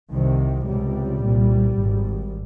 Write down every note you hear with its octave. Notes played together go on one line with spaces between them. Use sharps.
C2 C3 D#3
C#2 C3 G3
C2 A#2
G#1 G#2